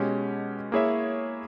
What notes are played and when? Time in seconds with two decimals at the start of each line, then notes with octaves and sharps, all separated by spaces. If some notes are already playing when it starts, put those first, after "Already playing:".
Already playing: B2 G#3 C#4 G4
0.72 A#3 E4 G#4 C#5 E5